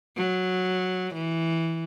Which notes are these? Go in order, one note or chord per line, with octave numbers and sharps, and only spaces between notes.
F#3
E3